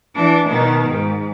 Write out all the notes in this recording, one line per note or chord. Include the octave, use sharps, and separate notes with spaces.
E3 D4
B2 D#3
G#2